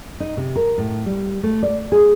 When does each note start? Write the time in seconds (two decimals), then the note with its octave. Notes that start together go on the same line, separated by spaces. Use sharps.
0.20 D#4
0.37 C3
0.56 A#4
0.78 A2
1.06 G3
1.43 A3
1.63 D5
1.92 G#4